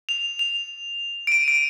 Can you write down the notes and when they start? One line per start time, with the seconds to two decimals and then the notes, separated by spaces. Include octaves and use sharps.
0.09 F7
0.39 F7
1.27 D7
1.32 D#7
1.48 D7